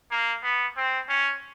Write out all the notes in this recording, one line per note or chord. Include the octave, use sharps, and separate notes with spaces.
A#3
B3
C4
C#4